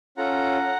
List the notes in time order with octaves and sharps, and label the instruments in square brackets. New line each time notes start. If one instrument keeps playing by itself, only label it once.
[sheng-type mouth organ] C#4 F4 A4 F#5 A#5